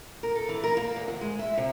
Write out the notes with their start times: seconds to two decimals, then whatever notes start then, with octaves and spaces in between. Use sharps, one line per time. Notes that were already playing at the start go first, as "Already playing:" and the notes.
0.23 A#4
0.35 A4
0.49 E3
0.64 A#4
0.77 A#3
0.96 E2
1.08 D2
1.21 G#3
1.39 E5
1.57 C3